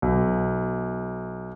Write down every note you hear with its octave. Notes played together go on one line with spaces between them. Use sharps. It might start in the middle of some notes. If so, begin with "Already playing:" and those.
B1